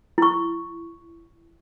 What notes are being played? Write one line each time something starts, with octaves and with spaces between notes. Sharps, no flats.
E4 C#6